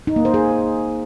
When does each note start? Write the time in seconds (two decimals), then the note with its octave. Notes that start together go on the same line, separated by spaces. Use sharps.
0.07 D#4
0.16 A#3
0.25 C5
0.34 G#4